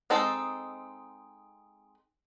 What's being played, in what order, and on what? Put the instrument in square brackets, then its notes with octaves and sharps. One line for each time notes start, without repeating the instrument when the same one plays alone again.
[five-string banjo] G#3 C4 D#4 A4